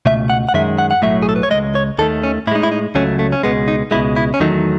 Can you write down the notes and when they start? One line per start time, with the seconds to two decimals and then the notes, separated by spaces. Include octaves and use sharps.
0.06 C#2 B2 A3 E5
0.30 F#5
0.49 F#5
0.54 F#2 D#3 G#3 E5
0.79 F#5
0.91 F#5
1.02 B1 A2 F#3 A3 E5
1.22 G#4
1.29 A4
1.36 B4
1.43 C#5
1.51 C#2 C#3 G#3 D#5
1.75 C#5
1.98 D#2 D#3 A3 A4
2.23 C#4
2.47 A2 E4
2.51 G#3 D#4
2.63 E4
2.72 D#4
2.95 C#2 C#3 F#3 A3 C#4
3.19 A3
3.32 C#4
3.43 C#2 B2 G#3 B3
3.68 D#4
3.91 C#2 B2 G#3 E4
4.16 E4
4.34 C#4
4.40 E2 D#3 F#3 A3 D#4